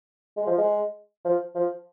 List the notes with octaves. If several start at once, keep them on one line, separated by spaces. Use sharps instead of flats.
G#3
F3
G#3
F3
F3